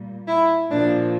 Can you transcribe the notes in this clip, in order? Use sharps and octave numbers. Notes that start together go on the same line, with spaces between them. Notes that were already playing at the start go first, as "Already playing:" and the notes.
Already playing: A#2 G3
E4
A#2 F3 D4